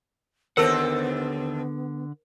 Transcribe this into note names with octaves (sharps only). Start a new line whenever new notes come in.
D#2 D3 B3 C4 A4 A#4 C5 F#5